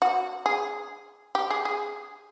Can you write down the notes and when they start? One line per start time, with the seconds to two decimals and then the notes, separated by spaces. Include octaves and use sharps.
0.02 F#4
0.46 G#4
1.35 G4
1.50 G#4
1.65 G#4